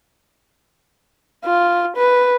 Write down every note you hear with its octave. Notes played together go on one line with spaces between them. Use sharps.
F4
B4